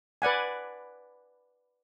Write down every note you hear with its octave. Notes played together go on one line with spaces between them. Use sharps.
B4 D5 F#5 G#5